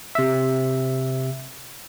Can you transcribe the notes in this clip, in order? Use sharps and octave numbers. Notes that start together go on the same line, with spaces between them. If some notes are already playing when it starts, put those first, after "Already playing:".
C3 E5